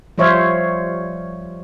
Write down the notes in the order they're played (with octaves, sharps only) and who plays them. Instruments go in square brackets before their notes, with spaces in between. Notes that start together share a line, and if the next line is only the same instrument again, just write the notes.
[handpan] F3 G3 C5 C#5 E5 F5